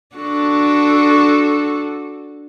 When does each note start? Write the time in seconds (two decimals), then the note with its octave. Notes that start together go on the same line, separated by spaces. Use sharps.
0.16 D4 F#4 A4